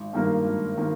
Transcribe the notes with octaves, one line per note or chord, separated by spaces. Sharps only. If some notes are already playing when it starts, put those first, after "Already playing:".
Already playing: G#1
G2 D#3 A#3
G#1
D#3 A#3